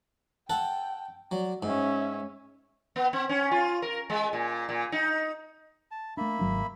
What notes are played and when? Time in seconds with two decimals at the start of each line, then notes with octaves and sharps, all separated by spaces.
0.50 A4 F#5 G5
1.32 F#3 D5
1.63 G#2 C#4 E5
2.96 B3
3.13 C4
3.29 C#4
3.51 F4
3.82 A#4
4.10 G#3
4.33 A#2
4.69 A#2
4.92 D#4
5.91 A5
6.17 A3 A#3 D4 E5 B5
6.39 G#1 F#3 D4